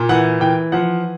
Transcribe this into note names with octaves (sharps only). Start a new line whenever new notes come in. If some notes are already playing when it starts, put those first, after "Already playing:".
Already playing: A#2
E3 F#5
E3 G5
F3 F#5